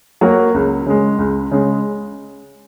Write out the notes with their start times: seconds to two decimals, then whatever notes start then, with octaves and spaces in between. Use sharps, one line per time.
0.21 F#3 A#3 F#4
0.54 C#2
0.86 C#3 G#3
1.19 C#2
1.52 C#3 G#3